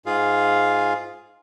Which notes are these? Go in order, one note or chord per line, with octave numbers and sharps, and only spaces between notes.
G#2 F4 G#4 F5